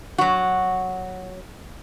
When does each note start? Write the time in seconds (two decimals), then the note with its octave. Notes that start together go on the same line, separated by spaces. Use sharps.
0.18 F#3 F#4